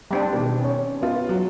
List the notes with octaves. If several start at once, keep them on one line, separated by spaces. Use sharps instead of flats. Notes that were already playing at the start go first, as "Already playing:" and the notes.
G3 C4 D4
B2 D#3
C#4 C#5
B3 F4
F#3